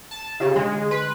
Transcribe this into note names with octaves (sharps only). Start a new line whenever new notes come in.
A5
C#3 F4 G4
D3 G#3
B4 C6